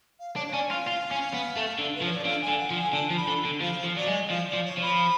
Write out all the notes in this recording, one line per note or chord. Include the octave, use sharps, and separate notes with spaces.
F5
D4 C#5
C#5
C#4 D5
F4 F5
F4
C#4
B3
A3
D3
B4
F3
C#5
D5
D3 F5
G#5
D3
F#5
F3
G#5
D3 A5
F3
B5
D3
D3
F3 F5
F3
F#3 D5
G#3
F3 F5
D5
F3
C#5
F3 B5